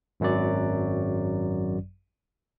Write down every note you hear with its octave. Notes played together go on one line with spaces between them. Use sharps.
G#1 F#2 F#3 D5